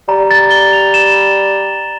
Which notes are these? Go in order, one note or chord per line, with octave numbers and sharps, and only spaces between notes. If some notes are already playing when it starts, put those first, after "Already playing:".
G3 A#5
A6
G7
F7
E7